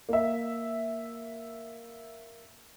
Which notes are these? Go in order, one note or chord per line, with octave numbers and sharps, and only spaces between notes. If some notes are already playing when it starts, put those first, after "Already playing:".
A#3 E5